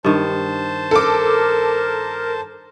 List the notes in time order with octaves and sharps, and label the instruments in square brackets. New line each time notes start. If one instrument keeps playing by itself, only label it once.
[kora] G2 D#3 [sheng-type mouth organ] C5 A5
[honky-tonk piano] A4 D6 [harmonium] A#4